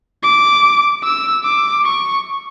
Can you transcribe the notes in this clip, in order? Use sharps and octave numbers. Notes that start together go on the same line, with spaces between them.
D6
E6
D6
C#6